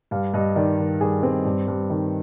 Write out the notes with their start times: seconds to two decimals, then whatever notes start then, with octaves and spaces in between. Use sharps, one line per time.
0.11 G2 F5
0.34 G2 D#5
0.56 D#3 D5
0.78 D#3
1.01 G2 G#4
1.23 G2 C4
1.45 G2
1.68 G2
1.90 D#3